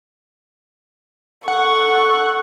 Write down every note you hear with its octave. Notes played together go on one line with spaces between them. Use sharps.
A4 F#5 C#6